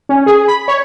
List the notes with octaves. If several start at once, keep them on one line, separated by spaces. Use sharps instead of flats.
C#4
G#4
B5
C#5